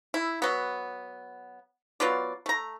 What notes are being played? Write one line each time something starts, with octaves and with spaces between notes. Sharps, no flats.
E4
F#3 B3
F#3 B3 F4 D5
A3 A#5